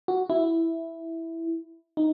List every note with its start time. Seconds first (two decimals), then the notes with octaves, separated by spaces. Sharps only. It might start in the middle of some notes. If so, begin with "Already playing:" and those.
0.08 F#4
0.30 E4
1.97 D#4